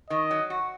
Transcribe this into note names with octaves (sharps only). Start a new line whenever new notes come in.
D#3 D#5
F#3
F#4